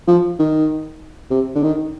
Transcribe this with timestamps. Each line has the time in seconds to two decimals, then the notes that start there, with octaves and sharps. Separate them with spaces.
0.08 F3
0.39 D#3
1.31 C3
1.55 D3
1.63 D#3